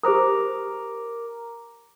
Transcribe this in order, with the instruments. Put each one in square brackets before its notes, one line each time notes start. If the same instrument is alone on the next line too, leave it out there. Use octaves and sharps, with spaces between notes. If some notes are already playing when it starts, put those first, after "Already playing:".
[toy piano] G4 C5 D#6 [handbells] A#4 A#5 D6